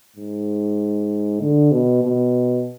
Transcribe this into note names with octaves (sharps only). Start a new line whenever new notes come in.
G#2
D3
B2
B2